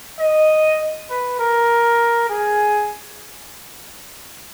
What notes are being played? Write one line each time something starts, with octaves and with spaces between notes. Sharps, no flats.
D#5
B4
A#4
G#4